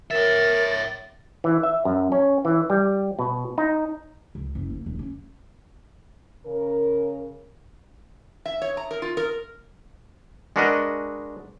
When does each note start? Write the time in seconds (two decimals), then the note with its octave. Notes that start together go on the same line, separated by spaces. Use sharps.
0.11 A#4 C#5 E5 A6
1.44 E3
1.63 E5
1.85 F#2
2.12 C#4
2.45 E3
2.70 G3
3.19 B2
3.58 D#4
4.35 C#2
4.55 F#1
4.70 A#3
4.86 D#1
4.99 C#4
6.46 C#3 A#4
8.46 E5
8.62 C#5
8.77 A#5
8.91 A#4
9.02 F4
9.17 A#4
10.56 G#3 D4 F#4 A#4 B4 D#5